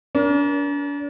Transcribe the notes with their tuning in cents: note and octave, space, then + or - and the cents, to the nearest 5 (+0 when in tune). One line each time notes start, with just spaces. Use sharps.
D4 -40 A#4 +30